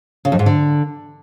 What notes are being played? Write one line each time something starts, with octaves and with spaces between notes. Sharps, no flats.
C#3
F2
G#2
D3